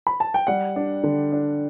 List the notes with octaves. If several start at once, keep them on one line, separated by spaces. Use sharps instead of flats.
B5
A5
G5
G3 F#5
D4
D3
D4